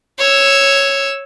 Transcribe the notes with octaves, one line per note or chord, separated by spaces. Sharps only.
C#5 E6